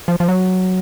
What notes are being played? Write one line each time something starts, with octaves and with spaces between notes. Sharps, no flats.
F3
F3
F#3